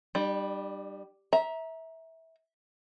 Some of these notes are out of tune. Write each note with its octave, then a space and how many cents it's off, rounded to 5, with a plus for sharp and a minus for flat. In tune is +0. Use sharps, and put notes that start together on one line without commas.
G3 +0 D4 +45
E5 -20 A#5 +15